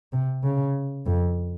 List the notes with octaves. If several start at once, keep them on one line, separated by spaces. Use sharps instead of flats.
C3
C#3
F2